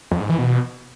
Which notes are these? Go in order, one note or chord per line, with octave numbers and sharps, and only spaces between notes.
F2
G#2
E3
B2